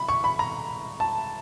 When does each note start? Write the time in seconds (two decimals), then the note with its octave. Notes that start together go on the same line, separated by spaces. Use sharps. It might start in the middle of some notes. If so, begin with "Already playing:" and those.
Already playing: C#3 B5
0.08 C#6
0.24 B5
0.39 A#5
1.00 A5